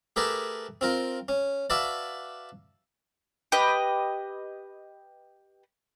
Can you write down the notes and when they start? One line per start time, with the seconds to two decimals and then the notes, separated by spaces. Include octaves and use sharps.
0.16 A3 G4 G#4 A#4 B4 A5
0.81 C4 F4 A#4
1.28 C#4
1.70 F#4 B4 D5 E5 F5 A5
3.52 G4 B4 D#5